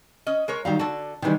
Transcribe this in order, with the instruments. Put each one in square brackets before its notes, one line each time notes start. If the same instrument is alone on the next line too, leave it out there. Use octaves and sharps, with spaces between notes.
[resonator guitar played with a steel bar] C#4 D#5
G#3 A#4 C#5
[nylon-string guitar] D#3 F#3 G3 [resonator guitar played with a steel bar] F5 A#5
[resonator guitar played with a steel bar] D3 F#4 [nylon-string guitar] A5
[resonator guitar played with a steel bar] C3 G#3 [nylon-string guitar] D#3 E3 G3